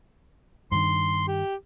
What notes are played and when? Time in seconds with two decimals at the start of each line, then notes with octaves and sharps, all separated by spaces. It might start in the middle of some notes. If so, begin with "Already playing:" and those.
0.72 G2 D#3 C6
1.28 G4